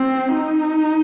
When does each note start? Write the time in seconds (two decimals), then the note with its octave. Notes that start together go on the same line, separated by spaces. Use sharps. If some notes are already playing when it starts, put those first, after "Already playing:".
Already playing: C4
0.34 D#4